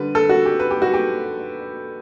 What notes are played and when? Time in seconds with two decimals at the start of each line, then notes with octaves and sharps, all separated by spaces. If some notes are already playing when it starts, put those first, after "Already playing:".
Already playing: D3 G3 B4
0.15 A4
0.29 F#4
0.45 G4
0.60 B4
0.71 G4
0.82 F#4
0.94 G4